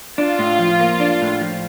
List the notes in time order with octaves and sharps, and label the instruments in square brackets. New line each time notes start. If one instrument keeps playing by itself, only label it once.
[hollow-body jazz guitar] D4 [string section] F4
[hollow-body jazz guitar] A2
F3
A#3
D4
A2
F3